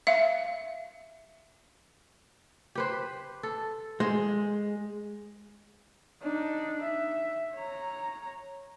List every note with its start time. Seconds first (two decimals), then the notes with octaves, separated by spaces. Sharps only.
0.07 E5 F5
2.75 G4 B4 C5
3.43 A4
4.00 G#3 C5
6.22 D4 D#4
6.82 E5
7.55 C#5 A#5